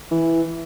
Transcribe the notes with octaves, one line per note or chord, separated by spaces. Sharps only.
E3